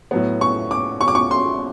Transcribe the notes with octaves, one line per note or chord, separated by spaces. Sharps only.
A2 F#3 B3
C#6
D6
C#6
D6
C#6
C6